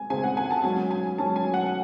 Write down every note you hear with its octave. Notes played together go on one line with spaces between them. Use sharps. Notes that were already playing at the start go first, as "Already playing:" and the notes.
Already playing: G#3 C4 G#5
C#3 G#3 C4 G#5
F#5
G#5
A5
G#2 F#3 C#4 G#5
G#5
G#2 F#3 C#4 A5
G#5
F#5